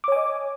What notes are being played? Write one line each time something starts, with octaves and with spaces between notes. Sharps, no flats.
C#5 D#5 G#5 D6